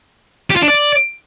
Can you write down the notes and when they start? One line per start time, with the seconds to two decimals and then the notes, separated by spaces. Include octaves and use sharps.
0.50 G4
0.56 F4
0.62 D4
0.68 D5